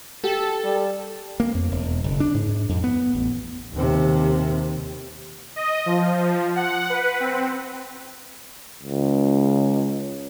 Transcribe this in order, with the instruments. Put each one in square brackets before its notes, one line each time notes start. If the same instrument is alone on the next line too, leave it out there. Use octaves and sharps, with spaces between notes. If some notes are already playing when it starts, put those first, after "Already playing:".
[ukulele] G4 [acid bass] A4
[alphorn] G3
[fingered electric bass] A#3
F2
E1
F#1
D4
G#2
F2
B3
A1
[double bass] D#2 C3
[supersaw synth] D#5
F3
F#5
B4
C4
[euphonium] C#2